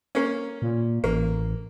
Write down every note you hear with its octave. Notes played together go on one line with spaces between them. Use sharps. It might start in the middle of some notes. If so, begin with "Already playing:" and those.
A#3 C#4
A#2
A1 A#3